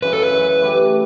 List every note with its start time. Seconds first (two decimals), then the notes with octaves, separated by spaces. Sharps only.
0.02 F#2 C#3 E3 B4
0.13 A4
0.23 B4
0.32 F#2 C#3 E3
0.61 E3 A3 E4 G4